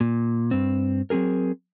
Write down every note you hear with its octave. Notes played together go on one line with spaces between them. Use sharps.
A#2
G2 C4
F#3 C4 C#4 G#4 A#4